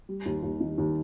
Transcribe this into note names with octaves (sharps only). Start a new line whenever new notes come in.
G3
D#2
D#2
D#3
D#2